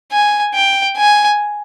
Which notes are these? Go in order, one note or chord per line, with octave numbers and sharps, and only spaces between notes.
G#5
G5
G#5